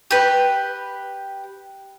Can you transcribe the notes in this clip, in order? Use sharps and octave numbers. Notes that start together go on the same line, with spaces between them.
G4 B4